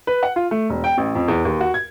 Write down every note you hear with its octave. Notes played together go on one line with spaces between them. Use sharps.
B4
F#5
F4
A3
E1
G5
A1
F2
E2
D#2
F#4
G#6